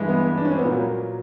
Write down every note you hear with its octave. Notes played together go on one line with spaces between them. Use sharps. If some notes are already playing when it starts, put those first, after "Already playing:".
Already playing: G2 E3 G#3
B3
D4
C#4
C4
B3
A#2 F#3 A#3